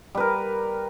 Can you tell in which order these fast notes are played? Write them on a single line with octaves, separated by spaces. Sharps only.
G3 B4 A#4